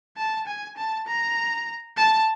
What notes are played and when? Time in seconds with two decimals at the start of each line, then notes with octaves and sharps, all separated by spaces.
0.17 A5
0.47 G#5
0.77 A5
1.06 A#5
1.97 A5